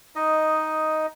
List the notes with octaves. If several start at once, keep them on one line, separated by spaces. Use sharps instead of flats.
D#4 D#5